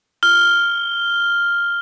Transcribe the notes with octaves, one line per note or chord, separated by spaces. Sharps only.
F6 G7